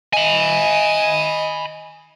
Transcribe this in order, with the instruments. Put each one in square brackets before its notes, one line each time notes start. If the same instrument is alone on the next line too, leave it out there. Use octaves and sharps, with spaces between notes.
[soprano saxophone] D#5 [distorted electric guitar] G#5 B5